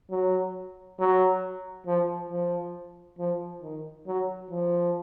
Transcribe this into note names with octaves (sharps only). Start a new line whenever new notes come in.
F#3
F#3
F3
F3
F3
D#3
F#3
F3